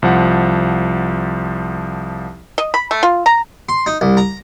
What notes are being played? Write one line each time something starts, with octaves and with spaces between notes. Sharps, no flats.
C2 F3 F#5
D#5
B5
A3
F4
A#5
C6
D#4
C2
A#5